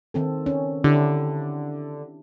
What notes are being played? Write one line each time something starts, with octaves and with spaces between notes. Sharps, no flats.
D#3 C4 A4
C#4
D3 D4 E4 G4